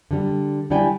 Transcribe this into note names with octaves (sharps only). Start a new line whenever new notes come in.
D3 G3
D3 G3 E4 D5 G5 G#5